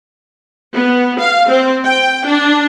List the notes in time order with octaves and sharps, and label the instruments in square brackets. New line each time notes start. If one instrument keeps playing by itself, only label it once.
[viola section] B3
F5
C4
G5
D4